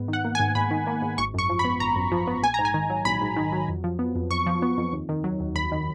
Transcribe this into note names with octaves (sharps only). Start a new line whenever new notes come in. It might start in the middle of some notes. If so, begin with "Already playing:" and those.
Already playing: G#2 B3
D#3
F#5
A#3
G#5
G#2
G#2 B5
D#3
A#3
G#2
G#1 C#6
F#2 C#6
F3
B5
B3
G#1 A#5
F#2
F3
B3
A#1 G#5
G#2 A#5
G#5
D#3
F#3
A#1 B5
G#2
D#3
F#3
F2
F3
B3
F2
F2 C#6
F3
B3
F2
D#2
D#3
F#3
D#2
D#2 B5
D#3